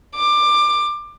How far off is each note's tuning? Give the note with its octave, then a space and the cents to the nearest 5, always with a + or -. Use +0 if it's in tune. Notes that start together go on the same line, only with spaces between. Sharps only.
D6 +20